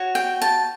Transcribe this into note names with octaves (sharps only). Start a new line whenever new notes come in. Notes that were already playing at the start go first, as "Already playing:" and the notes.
Already playing: F#4 C#5
G5
A5